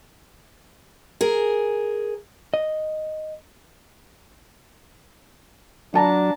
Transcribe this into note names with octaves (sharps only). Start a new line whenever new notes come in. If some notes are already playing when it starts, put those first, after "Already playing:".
G#4 A#4
D#5
F#3 D4 F#5 A5 A#5